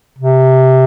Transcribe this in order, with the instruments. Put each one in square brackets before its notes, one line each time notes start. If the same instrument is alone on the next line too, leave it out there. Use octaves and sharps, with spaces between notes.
[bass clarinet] C3